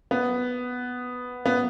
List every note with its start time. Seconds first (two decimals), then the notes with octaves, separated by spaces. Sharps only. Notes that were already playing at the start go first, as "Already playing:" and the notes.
0.11 B3
1.46 B3